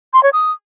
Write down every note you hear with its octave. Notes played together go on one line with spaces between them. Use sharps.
C6
C#5
D#6